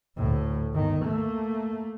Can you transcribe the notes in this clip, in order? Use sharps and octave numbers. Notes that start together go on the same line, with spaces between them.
D2 A2
G1 D#3
A3 A#3